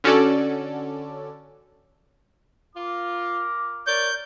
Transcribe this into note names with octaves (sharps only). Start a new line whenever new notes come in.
D3 C#4 F#4 A4 D5
F4 A#4 D6
A#4 C#5 D5 G6